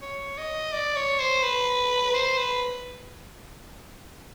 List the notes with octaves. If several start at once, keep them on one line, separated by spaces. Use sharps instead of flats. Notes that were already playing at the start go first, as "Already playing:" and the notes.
C#5
D#5
D5
C#5
C5
B4
C5
B4